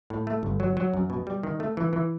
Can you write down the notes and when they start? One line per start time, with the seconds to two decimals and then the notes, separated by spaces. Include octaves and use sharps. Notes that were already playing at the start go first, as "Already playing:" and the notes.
0.10 A2
0.27 A3
0.43 G1
0.60 F#3
0.77 F#3
0.94 F#2
1.10 B2
1.27 G3
1.43 D#3
1.60 A3
1.77 E3
1.93 E3